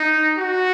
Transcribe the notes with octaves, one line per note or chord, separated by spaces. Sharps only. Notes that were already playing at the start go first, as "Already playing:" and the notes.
Already playing: D#4
F#4